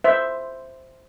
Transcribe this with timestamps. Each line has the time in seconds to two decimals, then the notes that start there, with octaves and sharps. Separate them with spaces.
0.04 C5 E5